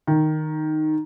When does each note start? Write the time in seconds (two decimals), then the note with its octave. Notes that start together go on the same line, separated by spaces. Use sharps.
0.07 D#3